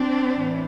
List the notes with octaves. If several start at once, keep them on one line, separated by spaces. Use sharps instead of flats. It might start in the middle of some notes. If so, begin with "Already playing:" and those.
Already playing: C4 D4
A2 E3